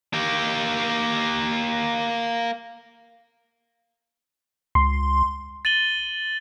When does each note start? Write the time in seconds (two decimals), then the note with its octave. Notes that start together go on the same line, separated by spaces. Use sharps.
0.13 A#3 G4
4.75 C#2 C6
5.65 A6 D#7 F#7 G7